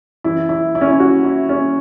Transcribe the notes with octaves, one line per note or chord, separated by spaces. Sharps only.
F#2 E3 E4
E4
E4
C#4
E4
F#4
E4
C#4